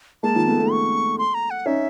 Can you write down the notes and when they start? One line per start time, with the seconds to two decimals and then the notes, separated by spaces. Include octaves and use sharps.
0.23 G#3 A#3 A5
0.35 D#3 F3
0.47 A3 B3
0.59 A3 B3
0.72 C#6
1.18 C6
1.34 A#5
1.50 F#5
1.66 C#4 D#4 E5